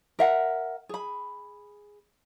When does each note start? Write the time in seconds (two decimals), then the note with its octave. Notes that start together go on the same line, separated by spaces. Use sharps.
0.19 A#4 E5 F#5
0.89 G#4 B5